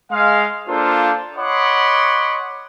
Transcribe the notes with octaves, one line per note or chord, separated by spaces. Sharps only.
G#3 F5
A#3 D4 F4 A4 C5
C#5 D#5 F#5 B5 C6 D6